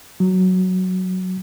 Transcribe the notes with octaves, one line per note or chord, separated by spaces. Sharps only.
F#3